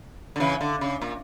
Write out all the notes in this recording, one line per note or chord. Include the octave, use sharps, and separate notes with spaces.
D3
C#3 E3
D3
C#3
A#2